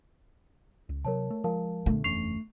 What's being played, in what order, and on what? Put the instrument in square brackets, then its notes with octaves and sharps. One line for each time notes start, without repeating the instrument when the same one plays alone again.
[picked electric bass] C#2
[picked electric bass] C3 F#3 [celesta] A#4 C#5 A5
[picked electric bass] A3
[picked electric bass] F3 G#3 [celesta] A#4 F5 A5
[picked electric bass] A#2 D3 [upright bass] A3 D4
[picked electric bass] F#1 E2 C#4 [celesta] C#6 C7 F7